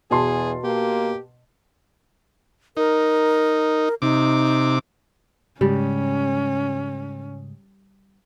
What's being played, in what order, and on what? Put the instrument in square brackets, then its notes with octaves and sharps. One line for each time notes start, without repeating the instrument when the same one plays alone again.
[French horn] E2 [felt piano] B2 A5 C6 [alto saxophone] G#4
[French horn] A#3 [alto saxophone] G4
[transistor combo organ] D#4 [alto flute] A#4
[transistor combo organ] C3 D6 [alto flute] D#4
[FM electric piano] G#2 C#3 G#3 [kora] G3 [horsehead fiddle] C#4